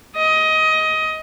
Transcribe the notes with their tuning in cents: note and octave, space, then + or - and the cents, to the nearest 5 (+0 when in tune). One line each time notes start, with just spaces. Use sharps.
D#5 +20